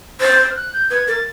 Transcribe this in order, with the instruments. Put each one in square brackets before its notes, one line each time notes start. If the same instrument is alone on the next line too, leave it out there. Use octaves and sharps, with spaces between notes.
[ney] C5 [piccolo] A6
[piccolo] F6
F#6
G6
[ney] B4 [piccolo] G#6
[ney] A#4 [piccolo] A6